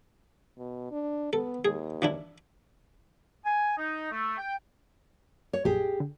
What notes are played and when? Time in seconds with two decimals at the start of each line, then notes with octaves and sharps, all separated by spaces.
0.58 B2
0.91 D4
1.33 B3 A4
1.65 D#2 G#4
2.02 E3 D4 E4
3.46 G#5
3.78 D#4
4.12 A3
4.38 G5
5.53 C#5
5.65 A#1 F#2 G4 G#4
6.00 D3